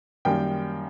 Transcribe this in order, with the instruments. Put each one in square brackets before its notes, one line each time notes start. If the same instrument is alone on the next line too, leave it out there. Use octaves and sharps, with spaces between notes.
[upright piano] F#2 D#3 G3 A#3 G5